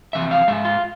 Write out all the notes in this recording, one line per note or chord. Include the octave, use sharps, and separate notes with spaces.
F2 C3 E3 E5
F5
G#2 G#3 E5
F4